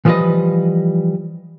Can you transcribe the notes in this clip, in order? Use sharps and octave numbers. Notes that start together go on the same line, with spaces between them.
E3 F3 G3 A4 B4 D#5